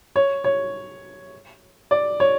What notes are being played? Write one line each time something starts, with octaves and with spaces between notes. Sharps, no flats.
C#5
C#5
D5
C#5